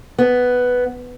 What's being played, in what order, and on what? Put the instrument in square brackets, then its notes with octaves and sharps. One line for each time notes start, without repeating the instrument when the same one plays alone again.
[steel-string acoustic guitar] B3